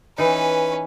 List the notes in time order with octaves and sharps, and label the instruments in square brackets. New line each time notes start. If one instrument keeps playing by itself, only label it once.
[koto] E3 D#4 [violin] C#4 B4